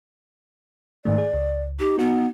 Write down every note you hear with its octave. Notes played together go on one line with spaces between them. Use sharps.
G#2 D#3 A3 D5
G#4
C#2
D#4 G4
B3 F#4